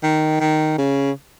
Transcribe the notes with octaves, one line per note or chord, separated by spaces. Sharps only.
D#3
D#3
C#3